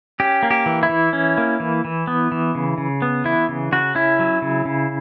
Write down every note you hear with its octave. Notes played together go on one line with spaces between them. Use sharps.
C#4 G4
A#3
G4
E3
E4
E3
C#4
A#3
E3
E3
B3
E3
C#3
C#3
B3
E3 E4
C#3
C#3 F#4
C#4 E4
F#3
C#3
C#3